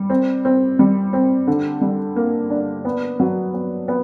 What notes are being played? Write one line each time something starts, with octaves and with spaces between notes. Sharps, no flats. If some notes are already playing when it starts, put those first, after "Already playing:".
Already playing: G3
C4
C4
G3
C4
D3
G3
A#3
D4
B3
F#3
B3
B3